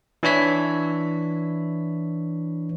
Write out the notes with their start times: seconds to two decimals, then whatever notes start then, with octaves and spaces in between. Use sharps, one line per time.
0.23 E3 D4 E4 C#5 B6